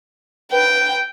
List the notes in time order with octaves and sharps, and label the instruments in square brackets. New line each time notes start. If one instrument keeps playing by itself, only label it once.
[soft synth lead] B4 [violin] G5